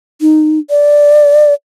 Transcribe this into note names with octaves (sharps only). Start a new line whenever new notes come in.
D#4
D5